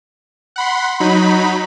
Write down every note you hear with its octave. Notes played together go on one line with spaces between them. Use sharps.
F#5 B5 C6
F#3 D#4 B5